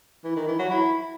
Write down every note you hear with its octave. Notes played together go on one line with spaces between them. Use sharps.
E3
D#3
E3
F#3
E4